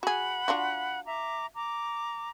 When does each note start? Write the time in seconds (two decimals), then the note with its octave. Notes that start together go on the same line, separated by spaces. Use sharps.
0.03 F#4 G#4 F#5 B5
0.48 D4 F4 F#4
1.06 E5 A#5 D6
1.54 A#5 D6